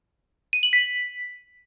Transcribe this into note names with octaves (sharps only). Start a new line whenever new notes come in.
D#7
F#7
B6